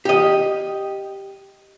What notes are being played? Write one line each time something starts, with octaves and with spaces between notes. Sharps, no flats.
G4 D#5